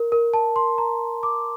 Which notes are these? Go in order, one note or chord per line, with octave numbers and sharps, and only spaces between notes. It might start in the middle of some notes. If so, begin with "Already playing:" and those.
Already playing: A#4
A#4
A5
C6
A#5
D6